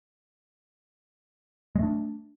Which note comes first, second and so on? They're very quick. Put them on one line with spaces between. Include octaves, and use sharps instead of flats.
G#3 A3 D4